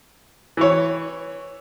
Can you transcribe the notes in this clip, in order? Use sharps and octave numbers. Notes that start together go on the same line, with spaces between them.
E3 C#5